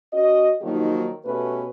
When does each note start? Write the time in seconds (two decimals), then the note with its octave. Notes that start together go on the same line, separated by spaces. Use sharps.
0.13 C#4 F#4 D#5
0.62 D#3 F3 F#3 A#3 D#4 G4
1.26 B2 A3 C#4 G4 B4